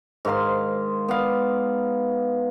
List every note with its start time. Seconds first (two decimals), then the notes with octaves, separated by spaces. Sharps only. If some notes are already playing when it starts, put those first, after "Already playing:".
0.25 G#2 D#3 F5 C6
1.08 B3 D5 F5